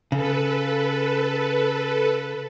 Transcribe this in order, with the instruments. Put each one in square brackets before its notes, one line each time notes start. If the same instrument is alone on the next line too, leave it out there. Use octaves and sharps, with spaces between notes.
[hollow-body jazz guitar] C#3 [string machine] A4 B4